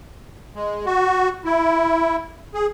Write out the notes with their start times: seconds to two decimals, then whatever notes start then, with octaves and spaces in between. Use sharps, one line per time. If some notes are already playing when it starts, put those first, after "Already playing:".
0.55 G#3
0.86 F#4
1.45 E4
2.54 G#4